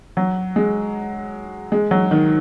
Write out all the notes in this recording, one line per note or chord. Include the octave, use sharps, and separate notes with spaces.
F#3
G#3
G#3
F#3
D#3